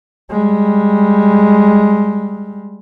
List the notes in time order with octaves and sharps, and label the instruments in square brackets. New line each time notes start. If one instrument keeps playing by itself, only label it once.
[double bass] G3 G#3